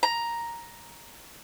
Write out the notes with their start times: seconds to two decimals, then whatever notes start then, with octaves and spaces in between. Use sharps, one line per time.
0.03 A#5